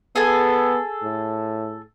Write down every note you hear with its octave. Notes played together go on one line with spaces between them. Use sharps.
B3 G#4 A4 G#5
A2